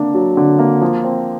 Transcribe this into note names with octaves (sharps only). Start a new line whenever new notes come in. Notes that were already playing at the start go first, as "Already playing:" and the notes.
Already playing: D3 A#3 D4
F#3
D3
A#3
F3
C4